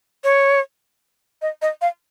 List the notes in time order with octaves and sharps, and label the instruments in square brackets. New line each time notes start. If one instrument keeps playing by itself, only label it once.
[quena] C#5
D#5
D#5
F5